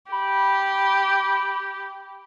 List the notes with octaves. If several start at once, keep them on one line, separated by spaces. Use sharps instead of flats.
G4 B5